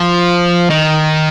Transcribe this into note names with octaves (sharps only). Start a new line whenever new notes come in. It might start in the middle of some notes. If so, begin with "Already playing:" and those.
Already playing: F3
D#3